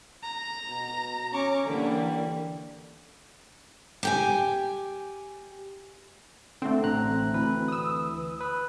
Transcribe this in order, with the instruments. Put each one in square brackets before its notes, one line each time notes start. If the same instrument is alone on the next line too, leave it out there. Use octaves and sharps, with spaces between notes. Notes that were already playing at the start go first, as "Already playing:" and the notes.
[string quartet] A#5
[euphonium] B2
[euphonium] C#4 [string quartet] A#5 C#6 D6
[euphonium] D3 [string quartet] E3 G3 A#3
[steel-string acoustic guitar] G4 G5 G#5
[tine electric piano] D3 [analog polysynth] A3 C4
[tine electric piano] A1 A#5 F#6
D2 E3 B4
[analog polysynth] D#6 E6
[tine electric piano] B4